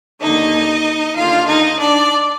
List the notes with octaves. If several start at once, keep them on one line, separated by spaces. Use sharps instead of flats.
D#2 D3 D#4 D#5
D#2 D3 F4 F5
D#4 D#5
D4 D5